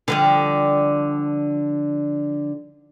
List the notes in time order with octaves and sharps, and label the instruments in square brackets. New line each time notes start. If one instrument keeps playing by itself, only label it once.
[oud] D3 F3 G3